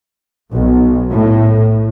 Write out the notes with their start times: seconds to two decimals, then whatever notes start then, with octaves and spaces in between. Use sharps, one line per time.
0.53 B1
1.12 A2